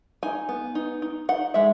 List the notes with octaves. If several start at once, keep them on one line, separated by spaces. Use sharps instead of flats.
D#4 G#5
B3
D#4
D#4
D#4 F#5
G#3 E5